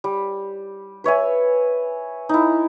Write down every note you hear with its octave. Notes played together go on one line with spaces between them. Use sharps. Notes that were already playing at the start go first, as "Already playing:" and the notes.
G3
B4 C#5 E5 G#5
D#4 E4